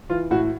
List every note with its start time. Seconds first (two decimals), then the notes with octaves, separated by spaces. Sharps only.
0.10 E3 F4
0.31 A2 F#4